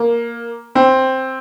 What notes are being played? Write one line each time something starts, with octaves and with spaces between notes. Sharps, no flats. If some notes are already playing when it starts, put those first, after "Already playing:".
Already playing: A#3
C4